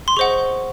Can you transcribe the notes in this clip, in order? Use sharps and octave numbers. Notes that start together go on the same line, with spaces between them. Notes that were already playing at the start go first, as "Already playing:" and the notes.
C6
G#4 C5 D#5 F#5 C#6